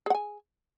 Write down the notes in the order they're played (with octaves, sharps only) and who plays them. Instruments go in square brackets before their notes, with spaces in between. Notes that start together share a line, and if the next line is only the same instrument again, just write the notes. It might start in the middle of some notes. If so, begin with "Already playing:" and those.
[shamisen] G#4
F#5
G#5